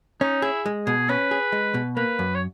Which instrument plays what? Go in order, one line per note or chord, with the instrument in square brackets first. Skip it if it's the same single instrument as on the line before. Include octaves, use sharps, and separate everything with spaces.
[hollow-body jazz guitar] C#4 [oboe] D#4
[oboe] E4 [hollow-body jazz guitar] G#4
[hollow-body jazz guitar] G#3
[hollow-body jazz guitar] B2 [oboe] G#4
[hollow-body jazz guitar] C#4 [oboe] B4
[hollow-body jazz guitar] G#4
G#3
B2
[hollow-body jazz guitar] A#3 [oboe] B4
[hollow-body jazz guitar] F#2
[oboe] C#5